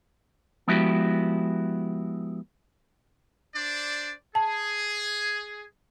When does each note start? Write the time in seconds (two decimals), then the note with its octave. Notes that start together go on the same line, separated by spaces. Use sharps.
0.68 F3 G#3 B3 E4 F#4 G4
3.55 D4 C5 D5
4.35 G#4 A5